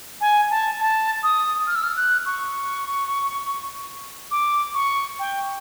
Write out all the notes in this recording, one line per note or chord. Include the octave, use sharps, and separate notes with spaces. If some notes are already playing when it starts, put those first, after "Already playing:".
G#5
A5
A5
D#6
F6
E6
F6
F#6
C#6
D6
C#6
G5